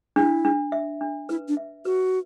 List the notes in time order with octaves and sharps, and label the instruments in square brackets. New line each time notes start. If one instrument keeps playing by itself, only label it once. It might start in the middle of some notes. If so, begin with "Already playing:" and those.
[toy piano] D4 [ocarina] E4
[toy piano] D4
E5
D4
[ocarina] E4 [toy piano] B4
[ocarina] D4
[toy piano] E5
[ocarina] F#4 [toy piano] B4